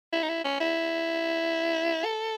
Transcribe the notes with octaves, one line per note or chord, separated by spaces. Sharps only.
E4
D#4
E4
C#4
E4
A4